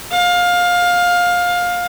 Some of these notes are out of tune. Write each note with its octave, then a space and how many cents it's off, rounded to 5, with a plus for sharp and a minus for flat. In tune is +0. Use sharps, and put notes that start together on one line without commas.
F5 +20